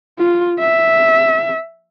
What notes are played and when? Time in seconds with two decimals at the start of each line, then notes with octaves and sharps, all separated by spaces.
0.19 F4
0.60 E5